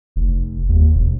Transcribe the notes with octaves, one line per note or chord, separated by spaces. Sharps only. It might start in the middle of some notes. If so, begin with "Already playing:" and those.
F1
D#2
E1